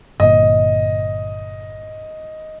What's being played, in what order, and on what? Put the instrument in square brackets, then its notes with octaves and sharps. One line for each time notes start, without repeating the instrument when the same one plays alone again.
[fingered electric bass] G1 A#2 [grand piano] D#5